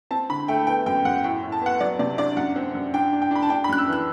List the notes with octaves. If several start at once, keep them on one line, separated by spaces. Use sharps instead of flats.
C4 A5
D3 B5
A3 G5
B3 G5
F#2 G5
F#2 F#5
A2 G5
A2
A5
B3 F#5
F#3 D5
C3 D5
D4 D5
F#2 F#5
C4
F#2
D4 G5
D4
G5
D4 B5
A5
D4 G5
B5
F#2 F#6
E6
E3
F#6